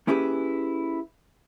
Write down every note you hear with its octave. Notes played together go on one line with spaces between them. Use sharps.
A#3 C#4 E4 G4 G#4 B4